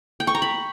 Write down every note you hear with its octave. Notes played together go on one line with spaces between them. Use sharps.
G5
C#6
A#5
B5